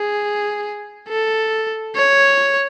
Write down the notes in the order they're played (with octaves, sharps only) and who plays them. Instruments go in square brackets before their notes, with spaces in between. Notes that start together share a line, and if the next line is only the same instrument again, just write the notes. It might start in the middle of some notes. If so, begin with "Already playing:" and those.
Already playing: [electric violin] G#4
A4
C#5